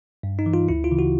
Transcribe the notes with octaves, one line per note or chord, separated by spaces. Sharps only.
G2
D#4
E3
F4
D2 E4
F4
C#3 E3
F#4